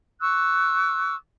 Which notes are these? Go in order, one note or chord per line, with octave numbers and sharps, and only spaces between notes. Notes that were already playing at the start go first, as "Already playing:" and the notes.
C#6 D6 E6 F#6